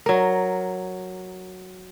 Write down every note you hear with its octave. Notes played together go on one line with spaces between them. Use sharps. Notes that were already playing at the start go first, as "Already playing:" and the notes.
F#3 A#4